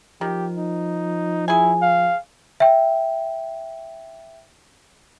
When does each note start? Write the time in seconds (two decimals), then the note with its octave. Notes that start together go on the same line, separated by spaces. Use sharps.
0.21 D#3 F3 G4
0.58 D#4
1.48 E4 G#4 G#5
1.82 F5
2.60 E5 G5